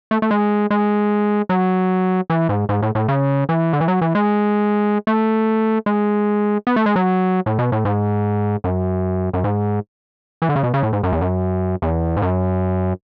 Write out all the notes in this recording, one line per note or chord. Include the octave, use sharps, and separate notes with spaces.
A3
A3
G#3
G#3
F#3
E3
G#2
G#2
A2
A2
C#3
E3
D3
E3
F#3
E3
G#3
A3
G#3
B3
A3
G#3
F#3
A2
B2
A2
G#2
F#2
F#2
G#2
E3
D3
C#3
B2
C#3
A2
G#2
F#2
E2
F#2
E2
G#2
F#2